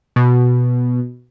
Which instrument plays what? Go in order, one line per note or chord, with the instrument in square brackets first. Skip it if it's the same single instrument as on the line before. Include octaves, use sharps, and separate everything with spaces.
[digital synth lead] B2